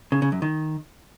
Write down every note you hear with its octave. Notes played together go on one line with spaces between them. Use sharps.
C#3
C#3
F#2
D#3